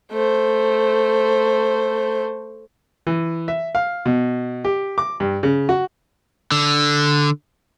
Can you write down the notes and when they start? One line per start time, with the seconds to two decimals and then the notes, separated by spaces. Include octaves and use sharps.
0.11 A3 C5
3.07 E3
3.48 E5
3.75 F5
4.06 B2
4.65 G4
4.98 D6
5.20 G2
5.43 C#3
5.69 F#4
6.52 D3